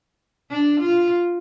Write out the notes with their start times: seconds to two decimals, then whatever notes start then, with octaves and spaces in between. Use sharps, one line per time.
0.50 D4
0.80 F4